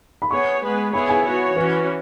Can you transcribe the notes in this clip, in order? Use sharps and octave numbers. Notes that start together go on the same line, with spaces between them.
B5
B3 G#4 C#5 C#6
G#3 B3 G#4 B4
B3 E4 G#4 C#5 B5
G#5
B3 F#4 C#5
E3 C#4 F#4 B4